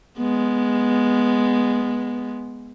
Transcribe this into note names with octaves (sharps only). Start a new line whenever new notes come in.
G#3 B3